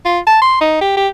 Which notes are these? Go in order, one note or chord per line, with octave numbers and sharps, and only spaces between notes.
F4
A5
C6
D#4
G4
G4